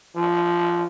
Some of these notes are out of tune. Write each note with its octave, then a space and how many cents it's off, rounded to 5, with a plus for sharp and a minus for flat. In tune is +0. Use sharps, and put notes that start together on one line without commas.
F3 -10